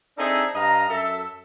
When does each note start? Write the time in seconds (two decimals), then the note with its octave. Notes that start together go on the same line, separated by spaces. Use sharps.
0.17 C4 D4 D#4 G#4 A4 E5
0.54 G2 D#5 F5 A#5
0.88 F#2 A4 E5